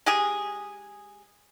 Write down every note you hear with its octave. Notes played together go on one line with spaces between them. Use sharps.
G#3 G4 G#4